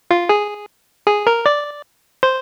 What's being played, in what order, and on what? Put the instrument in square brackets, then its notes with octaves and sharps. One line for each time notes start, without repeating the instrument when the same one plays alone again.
[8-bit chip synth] F4
G#4
G#4
A#4
D5
C5